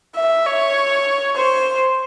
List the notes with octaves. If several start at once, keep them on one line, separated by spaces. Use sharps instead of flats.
E5
C#5
C5